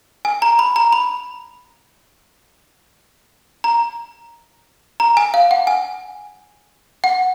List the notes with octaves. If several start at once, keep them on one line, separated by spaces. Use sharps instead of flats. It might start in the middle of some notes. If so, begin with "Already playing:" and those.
G#5
A#5
B5
A#5
B5
A#5
A#5
G#5
F5
F#5
G#5
F#5